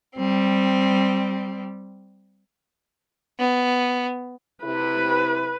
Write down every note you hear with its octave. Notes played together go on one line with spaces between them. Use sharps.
G3 C4
B3
C3 E4 B4